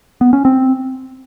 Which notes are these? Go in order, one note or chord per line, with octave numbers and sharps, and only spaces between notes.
B3
C#4
C4